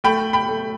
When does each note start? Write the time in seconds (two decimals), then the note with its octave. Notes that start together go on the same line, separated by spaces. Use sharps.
0.04 A3 G5 B5
0.33 G5 B5
0.48 A3